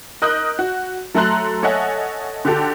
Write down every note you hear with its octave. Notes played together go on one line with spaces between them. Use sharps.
A#4 D#5 D#6 F#6 G6
F#4
F#3 A3 A4 A#5 C6 F#6
A4 C#5 D#5 E5 F#5 G#5
D3 F#4 G4 A4